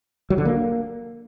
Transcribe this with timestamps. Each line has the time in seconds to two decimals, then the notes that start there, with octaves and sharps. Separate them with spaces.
0.30 F#3
0.38 D3
0.45 A#3